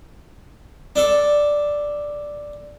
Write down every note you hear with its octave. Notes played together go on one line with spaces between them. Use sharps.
D4 A4